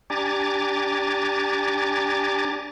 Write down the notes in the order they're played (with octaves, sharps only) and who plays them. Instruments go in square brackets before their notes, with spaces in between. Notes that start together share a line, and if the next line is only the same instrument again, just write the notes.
[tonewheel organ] D4 G4 G#5 A#5 D6 A6